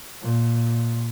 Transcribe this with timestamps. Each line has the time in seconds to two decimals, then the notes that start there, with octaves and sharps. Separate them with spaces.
0.22 A#2